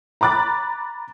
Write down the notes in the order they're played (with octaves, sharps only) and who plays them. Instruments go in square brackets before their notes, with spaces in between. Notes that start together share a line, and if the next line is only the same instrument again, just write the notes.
[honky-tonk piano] A#5 B5 D6 F#6 A6